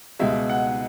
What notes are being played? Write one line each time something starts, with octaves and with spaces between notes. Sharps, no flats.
C#2 B2 G#3 E5
F#5